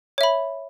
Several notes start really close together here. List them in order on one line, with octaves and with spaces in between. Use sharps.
C#5 E5 B5